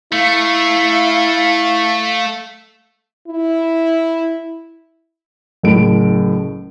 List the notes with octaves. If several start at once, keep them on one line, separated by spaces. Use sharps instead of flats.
A3 E4 F5
E4
F#1 A2 D7